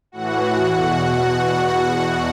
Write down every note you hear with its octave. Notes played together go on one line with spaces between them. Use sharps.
A2 E3 F#4 F#5
F#4 F#5
E2 B2